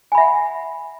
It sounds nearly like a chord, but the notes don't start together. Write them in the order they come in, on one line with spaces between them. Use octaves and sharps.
G#5 B5 E5 F#5